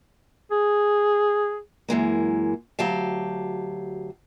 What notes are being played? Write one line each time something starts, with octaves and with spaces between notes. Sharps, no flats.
G#4
F#2 E3 G#3 A#3
D2 F#3 G4 F5 A5